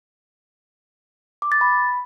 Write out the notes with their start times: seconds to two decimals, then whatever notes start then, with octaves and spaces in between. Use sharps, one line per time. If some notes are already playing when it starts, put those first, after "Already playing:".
1.42 D6
1.52 A6
1.61 B5